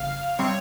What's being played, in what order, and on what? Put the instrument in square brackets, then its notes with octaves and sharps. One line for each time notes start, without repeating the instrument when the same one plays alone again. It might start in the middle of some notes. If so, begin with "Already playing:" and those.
Already playing: [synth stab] G1 F2 C#3 [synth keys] F5
[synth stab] C3 G3 C4 [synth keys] C#5